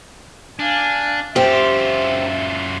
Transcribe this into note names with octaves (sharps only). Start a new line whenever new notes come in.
D4 F5 G#5
F#2 C4 F4 G4 E5